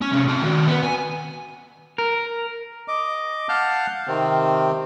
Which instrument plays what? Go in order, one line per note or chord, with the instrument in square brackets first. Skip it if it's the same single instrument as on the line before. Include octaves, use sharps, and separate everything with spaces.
[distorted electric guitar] C#4
C3 C#4
C4 A5
D#3 F#4
B3 B4
G#5
[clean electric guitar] A#4
[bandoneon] D#5 D6
F5 F#5 A5 F6 G6
C3 D#3 C4